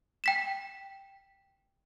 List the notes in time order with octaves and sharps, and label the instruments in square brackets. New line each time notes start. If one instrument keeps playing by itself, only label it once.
[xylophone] G5 B6 E7